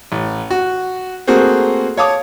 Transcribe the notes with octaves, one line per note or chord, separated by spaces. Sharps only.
A1
F#4
A3 A#3 C4 F#4 G#4 C5
C#5 F5 A5 D6 D#6